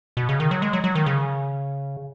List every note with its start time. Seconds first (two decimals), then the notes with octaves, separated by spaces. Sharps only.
0.17 B2
0.29 C#3
0.40 D#3
0.51 F#3
0.62 G#3
0.73 F#3
0.84 F#3
0.95 D#3
1.06 C#3